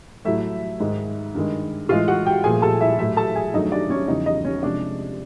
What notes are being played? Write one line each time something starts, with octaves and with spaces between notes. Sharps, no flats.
A2 F#3 A3 E4 E5
G#2 D#3 G#3
G2 D#3 G#3
A2 E3 G#3 F4 F5
F#4 F#5
G4 G5
A#2 F3 A3 G#4 G#5
A4 A5
E4 E5
A2 F#3 A3 E4 E5
A4 A5
G#4 G#5
G2 D#3 F#3 A3 D#4 D#5
D4 D5
C#4 C#5
E2 C#3 F3 D#4 D#5
D#4 D#5
C#4 C#5
C3 F3 G#3 D4 D5